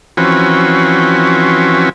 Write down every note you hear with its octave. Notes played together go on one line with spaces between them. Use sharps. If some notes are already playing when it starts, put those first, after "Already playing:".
E3 F3 C4 C#4 F#4 B4